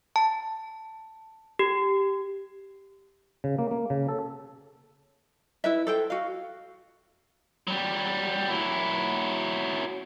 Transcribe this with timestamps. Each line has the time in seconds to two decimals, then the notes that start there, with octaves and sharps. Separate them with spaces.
0.16 A5
1.59 G4
3.44 C#3
3.59 A#3
3.71 A#3
3.90 C#3
4.09 A4
5.64 E4 B4 E5
5.87 A4 C5 G5
6.10 F#4 F5
7.67 F#3 G3
8.49 F#3 E4